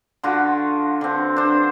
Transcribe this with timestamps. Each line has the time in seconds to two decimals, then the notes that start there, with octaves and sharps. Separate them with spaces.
0.23 D3 F4 F#4
1.01 D3 C4
1.36 D4 C5